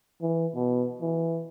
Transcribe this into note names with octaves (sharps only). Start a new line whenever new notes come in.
E3
B2
E3